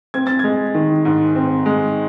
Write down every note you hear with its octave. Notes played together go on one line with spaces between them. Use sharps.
C4 G#6
A6
G#3 G#6
D#3
G#2
C4
G#3